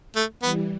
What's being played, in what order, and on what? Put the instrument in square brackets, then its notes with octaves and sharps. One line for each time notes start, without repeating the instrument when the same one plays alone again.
[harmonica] A3
[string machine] E3 G3 [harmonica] B3